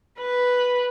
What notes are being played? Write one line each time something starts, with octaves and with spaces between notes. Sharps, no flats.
B4